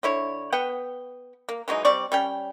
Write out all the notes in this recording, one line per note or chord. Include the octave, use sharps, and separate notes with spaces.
D3 E4 C#5
B3 F#5 G5
A#3
E3 F#3 G#3 D#4
G3 C4 D5 C#6
G3 C#4 G5